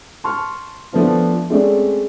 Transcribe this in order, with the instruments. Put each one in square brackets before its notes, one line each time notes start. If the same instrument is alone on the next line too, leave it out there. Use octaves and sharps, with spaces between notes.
[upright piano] A5 C6 C#6 F6
F3 A3 B3 D4 F4
G#3 A3 C4 C#4 G#4 D5